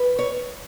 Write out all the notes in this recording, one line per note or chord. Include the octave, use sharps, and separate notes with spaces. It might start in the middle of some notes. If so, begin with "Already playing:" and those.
Already playing: B4
C#5